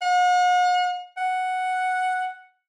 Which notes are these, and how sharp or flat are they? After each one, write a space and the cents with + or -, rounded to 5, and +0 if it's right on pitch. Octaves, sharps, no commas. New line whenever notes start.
F#5 -45
F#5 +0